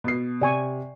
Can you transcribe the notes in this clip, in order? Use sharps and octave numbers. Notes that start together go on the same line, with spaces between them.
B2 C7
C3 D5 G#5 C#6